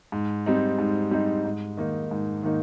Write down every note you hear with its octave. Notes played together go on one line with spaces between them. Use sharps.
G#2
G3 C4 D#4
G#2
G3 C4 D#4
G#2
D#3 A#3 D#4
G#2
D#3 A#3 D#4